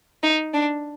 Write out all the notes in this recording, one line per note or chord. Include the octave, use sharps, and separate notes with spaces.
D#4
D4